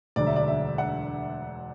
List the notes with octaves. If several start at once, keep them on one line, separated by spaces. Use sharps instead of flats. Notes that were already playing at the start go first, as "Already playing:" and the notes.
E1 D2 D3 F#3 D5
E5
D5
E5
F#5